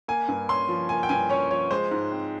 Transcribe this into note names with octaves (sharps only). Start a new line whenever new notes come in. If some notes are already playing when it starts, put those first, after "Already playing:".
A#3 G#5
G2
C#4 C6
F3
A#3 G#5
G5
G2 G#5
C#4 C#5
F3 C#5
G#3 C5
G#2
C4